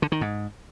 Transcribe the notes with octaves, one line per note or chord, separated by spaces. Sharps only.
D3
D#3
G#2